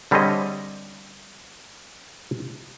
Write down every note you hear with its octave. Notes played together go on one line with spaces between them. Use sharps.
D3 G3 C4 G#4 C#5 D#5